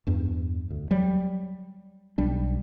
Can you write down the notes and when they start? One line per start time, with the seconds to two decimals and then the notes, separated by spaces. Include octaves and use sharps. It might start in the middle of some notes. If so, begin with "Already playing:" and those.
0.07 E2 G2
0.70 D2
0.91 F#3 G3
2.18 B1 G3 D4